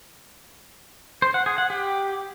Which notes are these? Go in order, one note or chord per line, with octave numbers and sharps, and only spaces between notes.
C5
F#5
G#4
F#5
G4